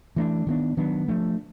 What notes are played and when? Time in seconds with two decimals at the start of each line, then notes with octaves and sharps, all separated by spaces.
0.16 E3 A3 D4
0.47 D#3 F#3 B3 D4
0.77 D#3 F#3 B3 D4
1.08 F3 A3 D4